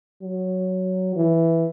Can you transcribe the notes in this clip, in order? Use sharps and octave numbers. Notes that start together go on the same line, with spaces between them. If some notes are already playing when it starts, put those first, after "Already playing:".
F#3
E3